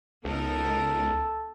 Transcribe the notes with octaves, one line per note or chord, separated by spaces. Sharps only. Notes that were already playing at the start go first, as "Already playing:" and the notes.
C#2 B3 D#4 A4 A#4